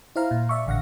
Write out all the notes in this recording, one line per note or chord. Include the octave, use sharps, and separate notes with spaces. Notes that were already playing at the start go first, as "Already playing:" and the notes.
E4 C5 F5 A#5
A#2
D5 E5 C#6
A1 D3 F5 F#5 A#6